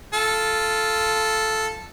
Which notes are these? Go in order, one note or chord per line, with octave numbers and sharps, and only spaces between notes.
F4 A4